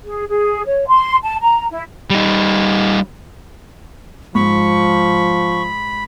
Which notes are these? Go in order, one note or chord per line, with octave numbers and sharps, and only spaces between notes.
G#4
G#4
C#5
C6
A5
A#5
E4
G3 D#4
G#2 F3 B5 C#6